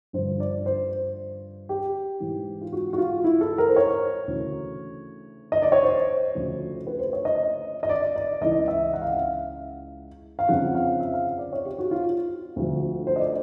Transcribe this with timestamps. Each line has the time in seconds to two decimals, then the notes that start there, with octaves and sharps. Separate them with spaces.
0.13 G2 D3 F3 C5
0.40 D5
0.66 C5
1.69 G4
2.20 G#2 E3
2.61 F4
2.72 F#4
2.93 F#4
2.98 F4
3.24 E4
3.41 A4
3.58 A#4
3.68 C5
3.76 C#5
4.27 D2 C#3 E3
5.52 D#5
5.62 D5
5.72 C#5
5.83 C5
6.35 D2 C#3 F3
6.87 B4
7.00 C5
7.13 C#5
7.25 D#5
7.83 D#5
7.89 D5
8.16 D5
8.41 C#2 C#3 E3 D#5
8.68 E5
8.93 F#5
9.02 F5
9.08 E5
9.17 F5
10.39 F5
10.48 F2 C#3 F3 F#5
10.75 F5
11.00 E5
11.14 F5
11.39 D5
11.53 C#5
11.65 G4
11.79 F#4
11.91 F4
12.56 D2 D3 F3
13.07 C5
13.16 D#5
13.20 D5